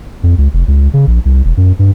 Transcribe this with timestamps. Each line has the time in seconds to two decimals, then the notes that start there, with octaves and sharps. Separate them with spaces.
0.23 F2
0.38 C#2
0.54 F1
0.68 C#2
0.94 C#3
1.07 A#1
1.25 C2
1.45 E1
1.57 F#2
1.79 G2